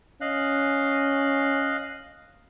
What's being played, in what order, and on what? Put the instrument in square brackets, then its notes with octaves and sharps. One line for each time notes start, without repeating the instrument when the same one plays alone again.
[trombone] C#4 [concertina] D#5 F5 F#6